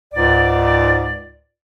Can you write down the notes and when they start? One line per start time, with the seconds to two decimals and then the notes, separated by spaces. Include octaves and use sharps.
0.14 C#2 G#2 D5